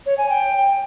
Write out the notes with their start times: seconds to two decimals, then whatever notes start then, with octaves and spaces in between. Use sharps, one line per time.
0.06 C#5
0.18 G#5
0.30 G5